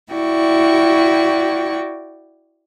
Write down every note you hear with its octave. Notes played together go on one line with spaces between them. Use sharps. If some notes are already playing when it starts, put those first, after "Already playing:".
E4 F#4 D5 G5 C#6